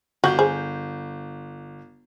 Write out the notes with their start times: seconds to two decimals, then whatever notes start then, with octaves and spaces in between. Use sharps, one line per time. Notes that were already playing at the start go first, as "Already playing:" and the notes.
0.24 G1 F#4 G6
0.39 G#4 C5